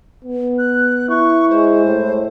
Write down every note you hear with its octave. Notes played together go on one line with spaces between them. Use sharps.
B3
F#6
E4 C#6
G#3 C5
A2